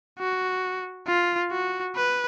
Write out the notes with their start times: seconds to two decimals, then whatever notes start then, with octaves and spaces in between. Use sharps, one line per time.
0.19 F#4
1.07 F4
1.51 F#4
1.96 B4